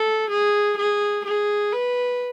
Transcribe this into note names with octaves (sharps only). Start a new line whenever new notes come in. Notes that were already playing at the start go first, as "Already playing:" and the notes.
Already playing: A4
G#4
G#4
G#4
B4